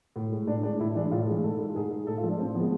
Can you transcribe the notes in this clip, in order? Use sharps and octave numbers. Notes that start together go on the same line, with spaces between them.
A2
G#3
A2 D4
G#3 D4
A2 E4
E3 G#3 D4
A2 F4
E3 G#3
G#2 A4
G#3
G#2 G#4
G#3
A2 A4
F4
F3 G#3
D4
A2 C4
F3 G#3 B3